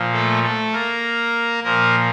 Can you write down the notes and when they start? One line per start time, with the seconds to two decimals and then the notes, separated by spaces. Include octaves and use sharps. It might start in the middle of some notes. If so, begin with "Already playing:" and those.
Already playing: A#2 F3
0.12 A3 A4
0.43 A3 A4
0.73 A#3 A#4
1.64 A#2 F3 A#3 A#4